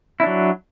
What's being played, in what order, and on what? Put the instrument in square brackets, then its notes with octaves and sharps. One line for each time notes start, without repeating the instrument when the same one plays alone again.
[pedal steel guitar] E4
D4
F#3